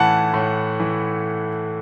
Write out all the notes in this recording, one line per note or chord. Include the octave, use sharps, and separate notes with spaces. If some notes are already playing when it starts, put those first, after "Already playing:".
Already playing: A2 E3 F#5 A5
A2
E3